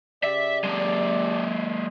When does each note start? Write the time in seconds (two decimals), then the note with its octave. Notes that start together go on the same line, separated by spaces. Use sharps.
0.23 C#3 G4 D5 E5
0.64 G#3 A#3